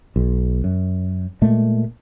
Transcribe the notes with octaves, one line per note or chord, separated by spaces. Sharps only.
B1
F#2
A#2 G#3 A3